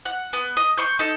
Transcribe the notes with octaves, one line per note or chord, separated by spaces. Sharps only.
F#5
B3
D#5
C6 C#6 G6
D#4 A4